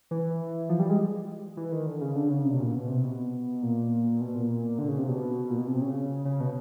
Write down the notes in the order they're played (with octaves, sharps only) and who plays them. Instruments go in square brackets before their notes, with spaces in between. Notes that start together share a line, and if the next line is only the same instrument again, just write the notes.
[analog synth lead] E3
F3
G3
G#3
E3
D#3
D3
C#3
D3
C#3
C3
B2
A#2
B2
C3
B2
A#2
B2
A#2
D3
C#3
C3
B2
A#2
B2
C3
C#3
C#3
B2